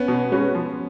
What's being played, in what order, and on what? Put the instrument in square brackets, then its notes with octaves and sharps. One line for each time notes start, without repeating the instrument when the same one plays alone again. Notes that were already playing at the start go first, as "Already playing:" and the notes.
Already playing: [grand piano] B3 C#4
[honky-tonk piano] B2
G#3 C#4 F#4 B4
F3